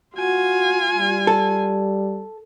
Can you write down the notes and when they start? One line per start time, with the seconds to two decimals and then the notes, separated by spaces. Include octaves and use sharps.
0.16 F4 F#4 G#5
0.95 G3
1.27 A4